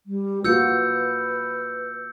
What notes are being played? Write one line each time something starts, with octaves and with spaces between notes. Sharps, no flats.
G3
A#3 F4 F#4 B4 E6 G6 C#7